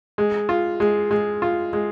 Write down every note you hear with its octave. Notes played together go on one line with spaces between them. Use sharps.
G#3
F4
G#3
G#3
F4
G#3